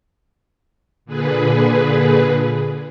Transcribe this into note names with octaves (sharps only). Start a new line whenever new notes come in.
A#2 D3 G#4 B4